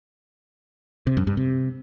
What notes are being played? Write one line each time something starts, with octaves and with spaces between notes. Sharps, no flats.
C3
F#2
G2
C3